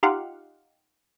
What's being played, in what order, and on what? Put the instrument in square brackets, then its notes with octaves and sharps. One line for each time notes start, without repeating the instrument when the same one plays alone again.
[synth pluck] D#4 F4 G4 F5 F#5